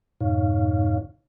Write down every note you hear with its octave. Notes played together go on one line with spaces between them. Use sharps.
F2 G#2 B2 D#4 C#5 F5